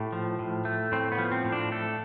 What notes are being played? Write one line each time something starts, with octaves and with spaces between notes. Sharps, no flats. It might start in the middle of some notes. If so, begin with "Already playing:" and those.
Already playing: A2 A3 G4
F3
A2
A3
A2 C4
B3
F3
C4
A2
D4
A3 A4